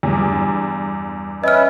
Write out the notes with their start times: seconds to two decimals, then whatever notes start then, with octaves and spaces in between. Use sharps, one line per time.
0.03 E2 G2
1.44 C#4 B4 D#5 E5 F6